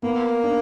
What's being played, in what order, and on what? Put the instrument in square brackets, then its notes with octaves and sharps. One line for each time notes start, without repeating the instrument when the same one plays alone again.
[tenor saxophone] A#3 [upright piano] B3
[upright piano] D4